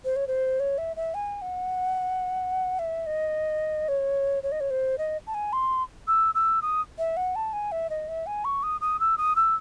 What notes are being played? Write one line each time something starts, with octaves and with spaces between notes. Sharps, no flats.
C5
C#5
C5
C#5
E5
E5
G#5
F#5
E5
D#5
C#5
C#5
D#5
C#5
C5
D#5
A5
G#5
C6
E6
E6
D#6
E5
F#5
A5
G#5
E5
D#5
E5
G#5
C#6
D#6
D#6
E6
D#6
E6